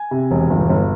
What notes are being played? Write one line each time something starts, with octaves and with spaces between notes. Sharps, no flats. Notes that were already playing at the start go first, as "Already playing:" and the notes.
Already playing: G#5
C3
E1
G1
G1